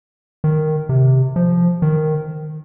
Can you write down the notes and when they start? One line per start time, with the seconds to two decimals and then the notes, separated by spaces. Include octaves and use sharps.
0.44 D#3
0.89 C3
1.36 F3
1.82 D#3